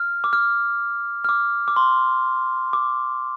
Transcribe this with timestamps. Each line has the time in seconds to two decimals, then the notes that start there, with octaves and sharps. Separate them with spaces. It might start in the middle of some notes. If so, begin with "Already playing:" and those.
Already playing: F6
0.24 D6
0.33 F6
1.24 F6
1.29 D6
1.68 D6
1.76 C6
2.73 D6